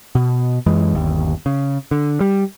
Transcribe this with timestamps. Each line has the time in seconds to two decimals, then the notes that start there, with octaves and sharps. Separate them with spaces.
0.15 B2
0.66 F#2 E3 G#3
0.95 G1 D#2
1.46 C#3
1.91 D3
2.21 G3